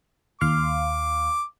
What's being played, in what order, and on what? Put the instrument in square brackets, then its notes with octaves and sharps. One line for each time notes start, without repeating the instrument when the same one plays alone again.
[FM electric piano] D#2 F5 C6 [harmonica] D6